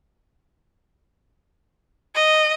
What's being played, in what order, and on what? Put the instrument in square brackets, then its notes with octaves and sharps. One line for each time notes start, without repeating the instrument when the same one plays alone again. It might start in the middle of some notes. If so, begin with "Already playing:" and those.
[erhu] D#5